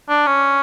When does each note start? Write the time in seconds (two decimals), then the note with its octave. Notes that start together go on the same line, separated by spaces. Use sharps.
0.09 D4
0.27 C#4